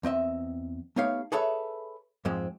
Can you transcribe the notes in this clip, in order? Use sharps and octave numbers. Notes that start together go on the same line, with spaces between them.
E2 C4 D#5 E5
A3 B3 D#4 G4 C#5 F5
G#4 A4 B4 C#5 E5
F2 G#2 F3 G#3 C4